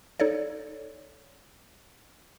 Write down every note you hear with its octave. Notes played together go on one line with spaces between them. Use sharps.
D#4 A4 C#5 D5